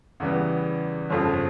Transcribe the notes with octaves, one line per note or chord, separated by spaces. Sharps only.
E2 C#3 E3 G3 B3
G1 F2 C#3 F3